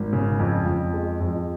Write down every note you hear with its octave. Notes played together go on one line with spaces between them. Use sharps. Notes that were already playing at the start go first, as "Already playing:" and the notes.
Already playing: G#1
C#3
F2
F2
G#3
F2